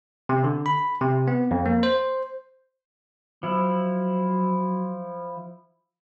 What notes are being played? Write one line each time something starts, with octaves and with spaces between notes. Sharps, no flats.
C3
D3
B5
C3
B3
F2
A#3
C5
F3 F#3 E4